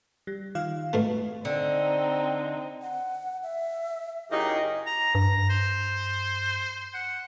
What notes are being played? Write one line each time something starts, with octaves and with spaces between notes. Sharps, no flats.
G3
D#3 F4 F5
G#2 B2 A3
D3 C4 D#4
F#5
E5
F#2 C#3 D#4 E4 G4 G#4 A#4
A#5
G2 A#5
C5
F#5